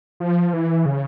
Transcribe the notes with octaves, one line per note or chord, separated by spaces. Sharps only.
F3
E3
C#3